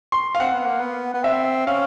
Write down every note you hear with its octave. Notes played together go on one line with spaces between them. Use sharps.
C6
F5
C4 F#5
B3
A#3
B3
B3
C4 E5
C#4 F5